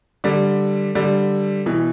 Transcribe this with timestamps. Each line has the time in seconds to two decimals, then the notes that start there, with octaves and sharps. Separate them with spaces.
0.24 D3 G3
0.95 D3 G3
1.66 B2 E3